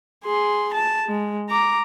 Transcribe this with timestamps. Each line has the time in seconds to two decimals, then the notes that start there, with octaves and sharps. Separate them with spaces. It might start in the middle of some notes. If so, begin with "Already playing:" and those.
0.24 G#4 C6
0.74 A5
1.06 G#3
1.50 A#5 D6